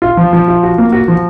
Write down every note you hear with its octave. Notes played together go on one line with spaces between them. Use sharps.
F4
F3
F3
F4
F#4
A#3
F#4
F3